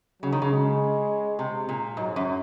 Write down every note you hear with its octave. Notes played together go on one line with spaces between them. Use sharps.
C#3 F#3
D#3
C#3
G#3
C3
A#2
G#2 F#3
F#2